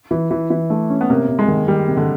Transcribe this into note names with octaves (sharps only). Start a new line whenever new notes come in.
E3
E3
E3
A3
C#4
B3
C3 A#3
C3
G#3
D#3
D#3 G3
C3
D3